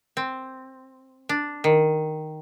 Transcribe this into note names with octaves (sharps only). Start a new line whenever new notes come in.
C4
D4
D#3